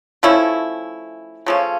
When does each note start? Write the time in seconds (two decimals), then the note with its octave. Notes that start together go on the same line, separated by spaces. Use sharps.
0.23 F3 A3 C#4 E4
1.46 C#3 F3 A3 C#4